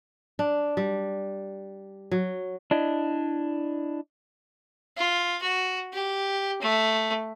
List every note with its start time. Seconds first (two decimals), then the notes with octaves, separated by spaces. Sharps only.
0.39 D4
0.77 G3
2.11 F#3
2.71 D4 E4 D#5
4.97 F4
5.42 F#4
5.93 G4
6.62 A3